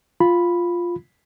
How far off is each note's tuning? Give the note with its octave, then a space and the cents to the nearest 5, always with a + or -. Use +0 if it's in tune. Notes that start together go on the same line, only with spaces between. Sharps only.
F4 +0 B5 +0